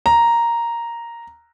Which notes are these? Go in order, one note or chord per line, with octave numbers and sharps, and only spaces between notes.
A#5